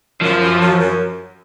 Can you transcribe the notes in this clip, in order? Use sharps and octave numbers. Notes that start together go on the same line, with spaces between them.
F#2 F3
F#2
F#2
F#2